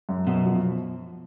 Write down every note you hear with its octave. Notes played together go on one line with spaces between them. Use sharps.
F#2
F#2 B2
F3